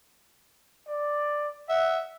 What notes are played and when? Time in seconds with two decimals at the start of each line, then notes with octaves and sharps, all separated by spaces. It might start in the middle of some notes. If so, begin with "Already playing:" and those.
0.87 D5
1.69 E5 F#5